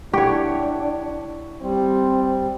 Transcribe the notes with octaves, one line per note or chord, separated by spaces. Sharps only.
D4 E4 G4 C#5 F#5 C#6
G3 C4